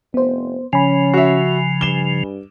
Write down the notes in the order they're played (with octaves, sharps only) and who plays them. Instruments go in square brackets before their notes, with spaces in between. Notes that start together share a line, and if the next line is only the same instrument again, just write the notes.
[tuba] F1 [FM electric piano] B3 C5
[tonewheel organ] C#3 F3 [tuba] C#4 [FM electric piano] G#5 B5
[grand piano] F#4 E5
[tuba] G2 [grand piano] E7 G7